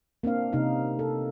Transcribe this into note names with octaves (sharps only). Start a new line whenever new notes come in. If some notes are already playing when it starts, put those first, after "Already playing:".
A#3 C4 D4 F5
C3 C#4 D#4 F5
A4